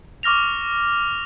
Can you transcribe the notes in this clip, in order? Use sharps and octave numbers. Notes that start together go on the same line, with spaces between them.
C#6 D6 F6 A#6 F7